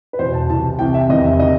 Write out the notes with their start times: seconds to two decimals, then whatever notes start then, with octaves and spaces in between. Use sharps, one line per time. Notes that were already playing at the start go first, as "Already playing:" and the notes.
0.13 B4
0.19 E2 C5
0.24 B2
0.34 A5
0.49 C2 C3 E3 A5
0.79 C2 C3 E3 G5
0.94 E5
1.09 E2 C3 D#3 D#5
1.24 E5
1.39 C3 D#3 D#5